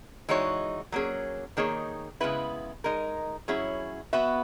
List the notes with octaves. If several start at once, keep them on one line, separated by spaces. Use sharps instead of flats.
E3 G#3 D#4 F#4 C#5
F#3 A#3 C#4 G#4
D#3 A#3 D#4 G#4 C#5
C#3 G#3 B3 E4 B4
G#3 D#4 A#4
F#3 C#4 E4 G#4
B3 F#4 B4 E5